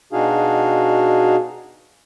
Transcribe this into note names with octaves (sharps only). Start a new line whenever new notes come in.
B2 D4 D#4 F#4 G#4 F5